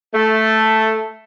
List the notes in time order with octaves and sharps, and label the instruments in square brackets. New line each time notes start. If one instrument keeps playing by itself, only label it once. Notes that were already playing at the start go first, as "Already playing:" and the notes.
[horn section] A3